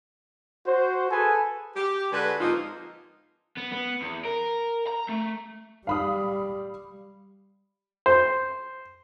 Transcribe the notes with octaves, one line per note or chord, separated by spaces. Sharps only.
F#4 C5
G#4 A4 B4 G#5
G4
D3 G#3 F#4 B4
G#2 F3 A#3 C4 D#4 F4
B3
B3
E2
A#4
A#5
A3
G3 F5 B5 D#6
C5